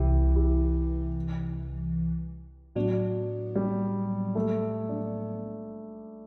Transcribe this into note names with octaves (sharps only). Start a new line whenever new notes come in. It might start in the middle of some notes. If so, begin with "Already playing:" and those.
Already playing: C2 C3 E3 E4 G4
E4 G4
A2 F#3 B3 D4 F#4
G3
A3
D4